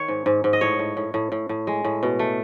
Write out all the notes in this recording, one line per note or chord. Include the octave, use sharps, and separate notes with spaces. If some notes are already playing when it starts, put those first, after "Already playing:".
Already playing: D#3 C#5
G#2
G#2
G#2
D#5
A2 C#5
A2
A2
A2
A2
A2
G#3
A2
B2
A3